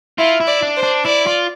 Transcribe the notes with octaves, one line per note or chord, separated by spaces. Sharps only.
E4 F4
E4
D5
D4
C5
D4
E4 D5
F4